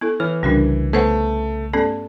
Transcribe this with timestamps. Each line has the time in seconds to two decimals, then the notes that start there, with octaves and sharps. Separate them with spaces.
0.01 B3 E4 A4
0.20 E3 C#5 F6
0.43 C2 C#3 F3 G3 D4 F#4 A#4
0.93 A3 B3 B4 C5 F#5
1.73 G2 A3 B3 C#4 A4 D5